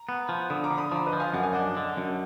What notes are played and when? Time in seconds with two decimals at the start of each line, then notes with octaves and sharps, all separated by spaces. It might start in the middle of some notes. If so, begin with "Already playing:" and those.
Already playing: A#5
0.09 B3
0.29 F3
0.50 D3 B5 D#6
0.64 A#5 D6
0.71 D3
0.78 B5 D#6
0.92 F3 A#5 D6
1.07 B4 D#5
1.13 F3
1.20 F5 G#5
1.34 F#2 F#5
1.43 G#5
1.52 D4 D#5 F#5
1.77 D3
1.97 F#2